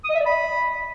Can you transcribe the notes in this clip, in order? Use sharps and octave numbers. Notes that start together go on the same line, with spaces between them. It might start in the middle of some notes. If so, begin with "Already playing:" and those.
D#6
D#5
E5
D5
B5